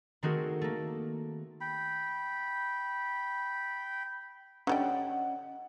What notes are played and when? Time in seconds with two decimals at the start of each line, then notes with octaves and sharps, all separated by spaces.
0.23 D#3 A3 C4 F#4 G#4 A#4
0.61 A3 A#3
1.61 G5 B5
4.67 D3 G3 C#4 D#5 F#5 G5